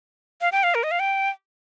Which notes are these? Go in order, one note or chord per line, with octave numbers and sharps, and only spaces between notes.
F5
G5
F5
A#4
D#5
F5
G5